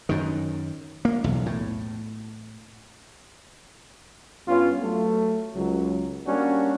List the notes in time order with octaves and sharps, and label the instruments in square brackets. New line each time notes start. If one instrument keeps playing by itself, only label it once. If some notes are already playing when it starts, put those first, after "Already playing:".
[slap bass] F#2 D#3
A#3
B1 E2
A2
[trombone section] G2 B3 C#4 F4
F#3 A3
C#2 F#3
G3 A#3 C#4 D4 F#4